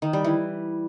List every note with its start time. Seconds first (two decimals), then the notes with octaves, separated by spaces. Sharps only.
0.02 D#3
0.13 G3
0.24 E3